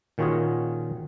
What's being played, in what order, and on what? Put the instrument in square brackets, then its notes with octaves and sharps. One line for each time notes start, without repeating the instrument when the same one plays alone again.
[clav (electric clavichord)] A#2 D#3 C#4 F4 F#4 G#4